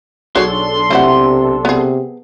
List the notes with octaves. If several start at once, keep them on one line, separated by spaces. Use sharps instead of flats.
B1 D4 F#4 G#4 A4 C#5 C6
C3 A3 E4 F#5
C3 B3 G#4